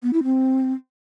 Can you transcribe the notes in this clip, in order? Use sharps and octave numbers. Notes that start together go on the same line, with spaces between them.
B3
E4
C4